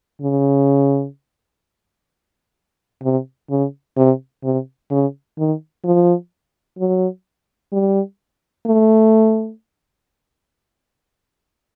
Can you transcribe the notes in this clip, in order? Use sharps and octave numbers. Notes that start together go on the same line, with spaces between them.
C#3
C3
C#3
C3
C3
C#3
D#3
F3
F#3
G3
A3